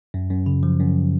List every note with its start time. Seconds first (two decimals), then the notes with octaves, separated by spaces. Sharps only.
0.14 F#2
0.31 F#2
0.46 C#3
0.63 F3
0.80 F#2